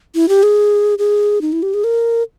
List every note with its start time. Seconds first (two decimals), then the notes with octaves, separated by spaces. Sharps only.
0.15 E4
0.29 G4
0.43 G#4
0.99 G#4
1.41 D#4
1.53 E4
1.63 G4
1.74 G#4
1.84 A#4